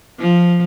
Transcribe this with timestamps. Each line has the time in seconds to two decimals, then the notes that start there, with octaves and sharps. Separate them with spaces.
0.20 F3